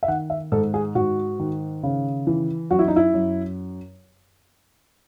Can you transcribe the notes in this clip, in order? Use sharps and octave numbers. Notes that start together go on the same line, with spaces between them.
E5
D#3 F#5
E5
G#2 A4
G#4
G#2 F#4
D#3
C#3
E3
F#2 F#4
E4
D#4
E4
F#2